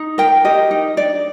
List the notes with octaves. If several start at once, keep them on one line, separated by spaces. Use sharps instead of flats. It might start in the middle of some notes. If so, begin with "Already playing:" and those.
Already playing: D#4
A#4 G5
G4 D#5
D#4
D4 D5